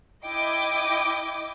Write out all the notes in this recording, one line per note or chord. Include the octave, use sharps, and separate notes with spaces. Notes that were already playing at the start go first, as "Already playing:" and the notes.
E4 D#5 G5 D6 D7